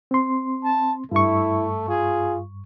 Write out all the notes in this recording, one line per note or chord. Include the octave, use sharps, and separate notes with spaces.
C4 C6
A5
G2 A3 E4 C#6
F4 G#4